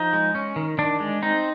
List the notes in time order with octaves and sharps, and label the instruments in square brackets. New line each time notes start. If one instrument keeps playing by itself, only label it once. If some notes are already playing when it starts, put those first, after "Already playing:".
Already playing: [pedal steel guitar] F3 D#4
G#3
C#4
D#3
D#3 D4
G#3
C4 D#4